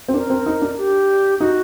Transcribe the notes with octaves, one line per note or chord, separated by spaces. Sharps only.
C4
D4 A#4
C4
D#4
D4
G4
D#4 F#4